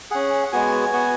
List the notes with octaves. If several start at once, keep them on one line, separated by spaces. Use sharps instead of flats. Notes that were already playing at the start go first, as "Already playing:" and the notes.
C#4 G#4 F#5
F#5
G#3 B3 F#4 G#5
B3 F#4